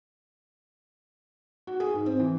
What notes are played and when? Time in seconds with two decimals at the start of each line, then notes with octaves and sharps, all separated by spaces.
1.67 F#4
1.80 G#4
1.94 G#2
2.06 C4
2.19 E3